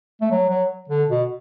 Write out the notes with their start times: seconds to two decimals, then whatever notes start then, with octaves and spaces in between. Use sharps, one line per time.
0.21 A3
0.31 F#3
0.49 F#3
0.89 D3
1.09 B2